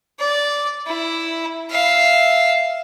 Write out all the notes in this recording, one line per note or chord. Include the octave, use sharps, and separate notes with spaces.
D5
E4
E5 F5